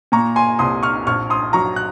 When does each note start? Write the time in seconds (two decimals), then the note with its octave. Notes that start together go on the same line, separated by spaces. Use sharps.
0.12 A#2 A#5 C#6
0.36 G#5 C6
0.59 C2 C6 D#6
0.83 C#6 F6
1.07 A#1 C#6 F6
1.30 C6 D#6
1.53 F#3 A#5 C#6
1.76 F#6